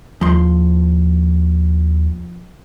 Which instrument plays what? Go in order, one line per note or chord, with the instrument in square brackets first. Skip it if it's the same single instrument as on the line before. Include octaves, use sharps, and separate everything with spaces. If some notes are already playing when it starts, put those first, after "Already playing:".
[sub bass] D#2 [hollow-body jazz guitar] F3 C6